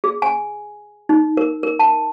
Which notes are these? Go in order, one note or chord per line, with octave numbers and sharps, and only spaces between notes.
G#4
G#5
D#4
A#4
A#4
A5